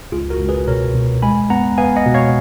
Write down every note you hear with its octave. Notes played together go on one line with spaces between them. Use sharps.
C#2 F4 G#4
F#4 A#4
C#2
G#4 B4
B2 A#4 C#5
B2
G#3 G#5 B5
B3 F#5 A#5
B3 F5 G#5
D#5 F#5
B2
C#5 F5